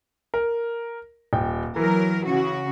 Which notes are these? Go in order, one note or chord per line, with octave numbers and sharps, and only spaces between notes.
A#4
D#1 G5
E3 F#3 A#4
C#3 F#4